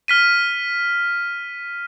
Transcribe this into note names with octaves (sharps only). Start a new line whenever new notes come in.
F6 B6 D#7